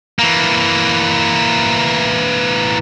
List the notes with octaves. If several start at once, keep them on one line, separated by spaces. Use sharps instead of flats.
E3 A#3